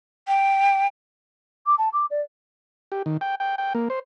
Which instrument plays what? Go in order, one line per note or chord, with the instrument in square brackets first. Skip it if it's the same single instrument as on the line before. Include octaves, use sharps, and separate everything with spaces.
[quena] G5
[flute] D6
A5
D6
D5
[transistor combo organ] G4
D#3
G5
G5
G5
A#3
C5